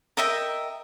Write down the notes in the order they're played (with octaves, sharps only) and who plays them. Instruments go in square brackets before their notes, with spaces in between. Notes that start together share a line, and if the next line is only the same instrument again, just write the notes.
[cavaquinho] A#4 D#5 E5 G5